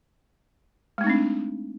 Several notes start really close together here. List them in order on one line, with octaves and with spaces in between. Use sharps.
G#3 A3 D#4 C4 D4